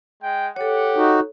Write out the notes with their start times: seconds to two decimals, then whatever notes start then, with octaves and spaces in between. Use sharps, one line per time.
0.21 G#3 G5
0.56 G4 A4 C#5 F#5
0.97 D#4 F#4